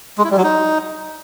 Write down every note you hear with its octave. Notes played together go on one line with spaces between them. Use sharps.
G#3
E4
G3
F#3
D#4